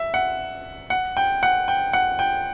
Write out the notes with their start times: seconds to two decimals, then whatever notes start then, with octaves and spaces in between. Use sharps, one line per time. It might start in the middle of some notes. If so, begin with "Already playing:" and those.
Already playing: E5
0.14 F#5
0.90 F#5
1.17 G5
1.43 F#5
1.68 G5
1.93 F#5
2.19 G5